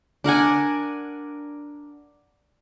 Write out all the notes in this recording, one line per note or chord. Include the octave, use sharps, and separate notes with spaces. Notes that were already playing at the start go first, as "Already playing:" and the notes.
D4 A#4 F#5 G#5